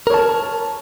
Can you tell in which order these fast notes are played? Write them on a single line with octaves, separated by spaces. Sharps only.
A#4 C#5 A5